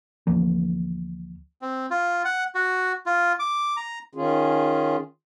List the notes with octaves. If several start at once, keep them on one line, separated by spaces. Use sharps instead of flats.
D2 E3 F3 A#3
C4
F4
F#5
F#4
F4
D6
A#5
D#3 C#4 F4 G#4